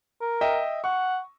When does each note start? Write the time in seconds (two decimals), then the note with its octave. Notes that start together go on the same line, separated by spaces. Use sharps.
0.21 A#4
0.41 D#5 E5 G5
0.84 F#5 C#6